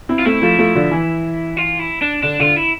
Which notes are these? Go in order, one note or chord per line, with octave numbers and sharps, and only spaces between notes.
C4 E4
F4
A3 C4 E4
F3 A3
F3 A3
D3 F3
E3
F4
E4
D4
D3 D4
D3 F4
E4